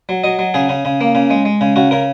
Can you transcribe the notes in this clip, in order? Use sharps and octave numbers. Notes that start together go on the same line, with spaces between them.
F#3
F#3 D#5
F#3
C#3 G#4
C#3
C#3
A#3
C#3
G#3
G#3
C#3
C#3 F#4
C#3 A#4